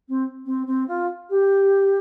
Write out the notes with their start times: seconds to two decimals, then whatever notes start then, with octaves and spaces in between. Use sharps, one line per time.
0.09 C4
0.46 C4
0.67 C4
0.88 F4
1.30 G4